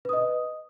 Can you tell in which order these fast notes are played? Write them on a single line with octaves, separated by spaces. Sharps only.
B4 D#6 D#5